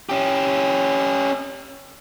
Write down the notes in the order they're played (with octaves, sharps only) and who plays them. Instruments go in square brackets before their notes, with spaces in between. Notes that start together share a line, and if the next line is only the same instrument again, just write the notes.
[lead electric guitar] C#4 G4